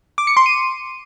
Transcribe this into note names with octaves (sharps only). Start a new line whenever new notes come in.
D6
C#7
C6
D#7